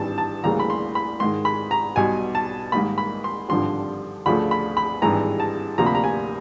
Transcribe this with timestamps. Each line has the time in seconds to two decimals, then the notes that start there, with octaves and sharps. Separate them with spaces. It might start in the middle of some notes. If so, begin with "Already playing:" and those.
Already playing: G#1 G2 E3 A5
0.18 A5
0.44 D2 C#3 E3 G3 A#3 A#5
0.60 B5
0.70 C6
0.95 B5
1.20 G#2 D#3 G#3 C6
1.45 B5
1.71 A#5
1.96 B1 B2 G3 G#5
2.35 A5
2.72 G#2 D#3 G3 A#3 B5
2.98 B5
3.24 C6
3.49 G#1 G2 D3 F3 C6
4.26 D2 C#3 F3 A3 B5
4.51 B5
4.77 B5
5.02 G#1 G2 E3 G#3 A#5
5.40 A5
5.78 D2 C3 F3 A#3 A#5
5.86 B5
5.95 A#5
6.04 G#5